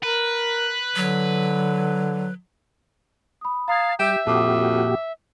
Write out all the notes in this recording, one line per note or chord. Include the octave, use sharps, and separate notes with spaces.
A#4 B4
D3 F#3
B5 D#6
F5 A5 A#5 D#6 G#6
G3 G4 E5 G6 E7
F2 A#2 F#4 G4 A5 D6 D#6